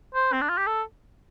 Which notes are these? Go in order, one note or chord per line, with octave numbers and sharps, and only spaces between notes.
C5
C4
D4
F4
G4
A4